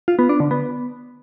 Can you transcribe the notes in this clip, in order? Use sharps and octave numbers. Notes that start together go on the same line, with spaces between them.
F4
B3
D4
D3
B3